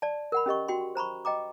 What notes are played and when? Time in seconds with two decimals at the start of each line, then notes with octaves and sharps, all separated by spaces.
0.02 D5 A5
0.32 A#4 F#5 B5
0.46 C#4 G4 D#5 C#6
0.68 F#4 G5 C6
0.95 C5 A#5 B5 C#6
1.25 D#5 G5 A#5 D6